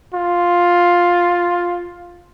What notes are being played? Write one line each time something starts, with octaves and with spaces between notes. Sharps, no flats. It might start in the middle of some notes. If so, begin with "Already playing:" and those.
F4